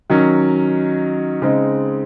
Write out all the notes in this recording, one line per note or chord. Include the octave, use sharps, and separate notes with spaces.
D#3 F#3 C#4
C#3 G#3 C4 D#4